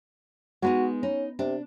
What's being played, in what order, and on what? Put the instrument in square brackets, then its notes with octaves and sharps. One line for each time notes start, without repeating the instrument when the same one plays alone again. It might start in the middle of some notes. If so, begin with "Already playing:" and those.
[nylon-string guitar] G#3 B3 D#4 [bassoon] F#4
[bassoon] C#4 [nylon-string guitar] D#4
[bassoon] C3 [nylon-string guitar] D4